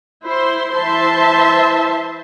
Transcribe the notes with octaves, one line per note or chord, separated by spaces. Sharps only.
E4 C5 C6
E3 E4 C5 E5 A5 C6